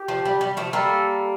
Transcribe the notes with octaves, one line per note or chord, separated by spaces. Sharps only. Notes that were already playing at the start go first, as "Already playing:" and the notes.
Already playing: G4
F3
G3
G3
F3 A3
G3 A#3 A4